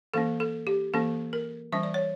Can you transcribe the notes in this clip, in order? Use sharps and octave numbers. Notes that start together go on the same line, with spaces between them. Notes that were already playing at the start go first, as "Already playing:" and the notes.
E3 A#3 C#4 A4
A4
G4
E3 A#3 C#4 A4
A#4
E3 G3 C#4 E5
D5
C#5